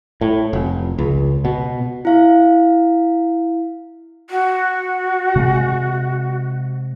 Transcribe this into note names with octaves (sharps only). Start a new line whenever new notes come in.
A2
F1
C#2
B2
E4 F5
F#4
C3 G#3